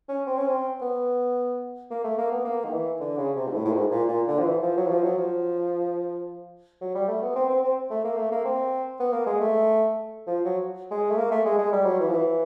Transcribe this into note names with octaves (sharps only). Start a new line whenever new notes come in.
C#4
C4
C#4
C4
B3
A#3
A3
A#3
B3
A#3
D#3
E3
D3
C#3
C3
G#2
A2
A2
G#2
A#2
A#2
D3
F3
E3
F3
F#3
E3
F3
F#3
F3
F#3
G3
A3
B3
C4
C4
C4
A3
A#3
A3
A#3
C4
B3
A#3
G#3
A3
F3
F#3
G#3
A3
A#3
A3
G#3
G#3
G3
F#3
E3
F3
E3